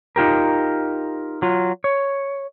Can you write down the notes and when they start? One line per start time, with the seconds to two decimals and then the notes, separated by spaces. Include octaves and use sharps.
0.16 D#4 F4 G4 A#4
1.42 F#3 F4
1.84 C#5